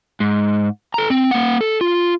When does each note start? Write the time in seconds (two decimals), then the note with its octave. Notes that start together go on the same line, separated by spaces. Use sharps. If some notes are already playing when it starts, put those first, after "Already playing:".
0.20 G#2
0.94 A4 A#5
1.10 C4
1.31 A#3 F#5
1.61 A4
1.81 F4